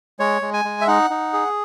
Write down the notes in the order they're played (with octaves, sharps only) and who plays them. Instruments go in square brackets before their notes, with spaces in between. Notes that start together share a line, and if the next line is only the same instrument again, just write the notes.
[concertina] G#3 C#5
G#3
G#5
G#3
E5
D#4 F#5
D#4
G#4